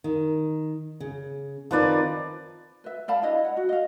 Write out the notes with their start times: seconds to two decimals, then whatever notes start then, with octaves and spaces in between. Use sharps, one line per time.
0.04 D#3
1.00 C#3
1.71 D#3 F3 C4 D#4 B4 D5
2.84 B4 E5
3.08 D5 F5 A5 B5
3.22 D4 E4 D#5 F5
3.44 F#5
3.57 F#4
3.69 D#5 F5